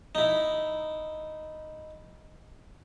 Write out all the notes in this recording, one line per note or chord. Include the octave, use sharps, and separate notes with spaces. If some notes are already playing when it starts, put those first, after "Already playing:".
D#4 E4